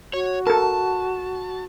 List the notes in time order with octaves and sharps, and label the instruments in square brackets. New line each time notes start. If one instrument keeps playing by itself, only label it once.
[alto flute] F#4 [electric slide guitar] C#5
[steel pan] A4 A#4 [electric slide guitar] A5